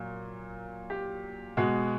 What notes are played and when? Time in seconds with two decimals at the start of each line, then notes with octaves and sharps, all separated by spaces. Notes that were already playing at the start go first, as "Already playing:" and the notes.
Already playing: A#2 F#3
0.90 G4
1.57 B2 G#3 F#4